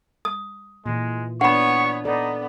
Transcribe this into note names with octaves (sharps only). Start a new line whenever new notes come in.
D#6
A#2 E3 G#3
B3 D4 C#5 F#5 B5 C#6
B3 D#4 A4 D5